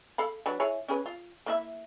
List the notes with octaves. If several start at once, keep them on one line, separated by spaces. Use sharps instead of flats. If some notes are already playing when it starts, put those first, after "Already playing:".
A4 F5 B5
F#3 D4 B4
E4 G#4 C#5
C#4 G#4 B4
F4
A#3 E4 E5